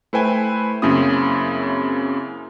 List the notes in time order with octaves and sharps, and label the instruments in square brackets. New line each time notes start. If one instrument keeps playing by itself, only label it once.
[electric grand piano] A3 E4 B4 C5 G5 G#5
F#2 C#3 A#3 C4 E4 D#6